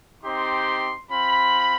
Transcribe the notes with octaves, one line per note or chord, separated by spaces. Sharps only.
C4 D#4 G4 C6
C4 F4 B5